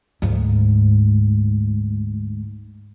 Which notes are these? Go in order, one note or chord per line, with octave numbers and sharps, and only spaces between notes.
D2 G#2